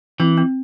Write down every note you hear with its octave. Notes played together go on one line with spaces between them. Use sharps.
E3 C4
C4